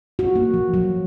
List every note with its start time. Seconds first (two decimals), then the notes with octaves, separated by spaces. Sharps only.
0.19 F#4
0.36 A#3
0.54 F3
0.74 F#3